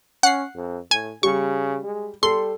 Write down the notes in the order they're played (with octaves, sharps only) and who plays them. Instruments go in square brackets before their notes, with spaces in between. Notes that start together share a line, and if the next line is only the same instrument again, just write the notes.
[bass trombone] C#4 [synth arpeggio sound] F#5 C7
[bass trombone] F2
[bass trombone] A2 [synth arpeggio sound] G#5
[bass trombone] C#3 [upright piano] G3 [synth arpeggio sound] C#6
[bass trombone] G#3
[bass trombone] G3 [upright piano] A4 [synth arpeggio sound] C6